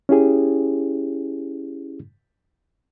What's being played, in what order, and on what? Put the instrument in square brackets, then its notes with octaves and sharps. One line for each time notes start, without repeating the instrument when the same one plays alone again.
[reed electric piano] C#4 E4 G4 G#4